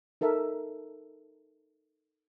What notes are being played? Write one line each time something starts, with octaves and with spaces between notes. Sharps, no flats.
D#4 A4 A#4 E5